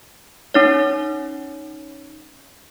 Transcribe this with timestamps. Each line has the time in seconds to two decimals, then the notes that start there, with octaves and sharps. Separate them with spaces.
0.54 C#4 D#4 C#5